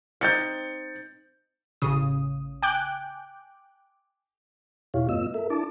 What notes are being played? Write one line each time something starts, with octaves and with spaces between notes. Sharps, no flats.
C4 D#4 G5 G6 A6 C#7
A1 C#3 D#6
G5 G#5 D6 F#6 G6
E2 B2 E4 G4 C#5 F5
G2 A3 B3 F4 D#5 E6
A4 A#4 E5
D4 E4 A5 D6